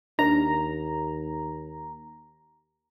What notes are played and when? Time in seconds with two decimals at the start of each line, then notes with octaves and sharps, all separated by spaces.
0.19 D#2 D4 A#4 A#5